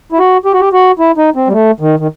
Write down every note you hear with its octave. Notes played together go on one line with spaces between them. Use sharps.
E4
F#4
G4
F#4
G4
F#4
E4
D#4
C4
G3
A3
D#3
D#3